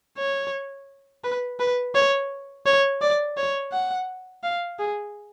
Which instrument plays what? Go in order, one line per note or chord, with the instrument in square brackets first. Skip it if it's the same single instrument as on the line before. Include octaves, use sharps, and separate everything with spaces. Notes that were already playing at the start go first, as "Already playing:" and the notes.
[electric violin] C#5
B4
B4
C#5
C#5
D5
C#5
F#5
F5
G#4